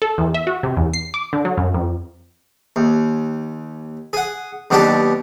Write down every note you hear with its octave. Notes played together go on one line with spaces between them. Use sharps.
A4
E2
E5
F#4
C3
E2
C7
D6
D3
F#3
F#2
F2
D#2
G#4 F#5
D#2 B2 F#3 D4 G4 D5